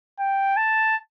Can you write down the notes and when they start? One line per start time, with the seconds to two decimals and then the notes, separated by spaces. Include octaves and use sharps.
0.20 G5
0.57 A5